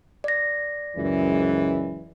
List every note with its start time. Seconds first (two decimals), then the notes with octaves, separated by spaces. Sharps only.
0.24 D5 A#6
0.96 C#2 F#2 E3